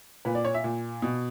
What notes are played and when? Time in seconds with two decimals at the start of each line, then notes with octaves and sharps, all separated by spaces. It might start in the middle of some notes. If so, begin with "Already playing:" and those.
0.25 A#2 B4
0.35 D5
0.45 C#5
0.54 E5
0.64 A#2
1.02 B2